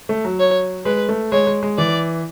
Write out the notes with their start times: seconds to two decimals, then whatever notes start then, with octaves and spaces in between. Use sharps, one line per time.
0.09 A3
0.25 F#3
0.40 C#5
0.85 G#3 B4
1.09 A3
1.32 G#3 C#5
1.47 G#3
1.63 G#3
1.78 E3 D5